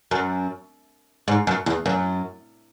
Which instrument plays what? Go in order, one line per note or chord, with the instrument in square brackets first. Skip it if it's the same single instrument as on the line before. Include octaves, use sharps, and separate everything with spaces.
[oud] F#2
G#2
F#2
E2
F#2